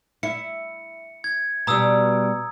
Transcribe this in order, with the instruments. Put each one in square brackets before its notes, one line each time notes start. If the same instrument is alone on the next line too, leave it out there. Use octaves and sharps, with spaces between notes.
[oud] E4 [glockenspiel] C#7
[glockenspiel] G#6
[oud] B2 G3 [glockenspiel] A#5 D#6 E6